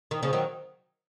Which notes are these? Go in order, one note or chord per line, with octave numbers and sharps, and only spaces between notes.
D#3
C#3 F3
D#3 F#3